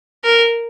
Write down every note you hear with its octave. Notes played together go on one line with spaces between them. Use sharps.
A#4